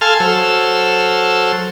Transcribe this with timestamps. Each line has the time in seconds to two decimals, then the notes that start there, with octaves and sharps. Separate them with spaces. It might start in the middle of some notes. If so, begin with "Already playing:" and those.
0.01 A4 F5 G#5 A5 C6 F6
0.20 F#3 A4 C5 E6 F6